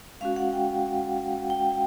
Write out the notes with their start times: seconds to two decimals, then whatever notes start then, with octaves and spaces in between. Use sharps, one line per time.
0.21 G#3 C#4 F#4 F5
0.36 F#5
0.53 G5
1.50 G5